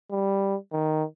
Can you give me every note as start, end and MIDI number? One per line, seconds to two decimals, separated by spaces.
0.11 0.55 55
0.72 1.04 51